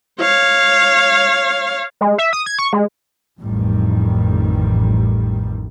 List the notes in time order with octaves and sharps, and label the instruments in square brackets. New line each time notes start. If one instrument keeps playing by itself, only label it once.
[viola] C#5 F5
[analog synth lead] G#3
E5
D#6
G#6
C#6
G#3
[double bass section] A1 F2 D#3 G3